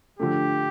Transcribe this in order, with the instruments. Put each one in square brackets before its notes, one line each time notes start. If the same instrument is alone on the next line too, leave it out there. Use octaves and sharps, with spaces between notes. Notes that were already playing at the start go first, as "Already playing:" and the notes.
[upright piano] D3 F3 A3 [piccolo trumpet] G4